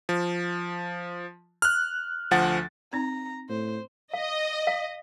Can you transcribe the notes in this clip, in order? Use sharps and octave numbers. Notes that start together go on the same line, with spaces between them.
F3
F6 F#6
D2 F3 F#5 A6
C4 D#4 A#5
A2 C5
D#5 F5
F5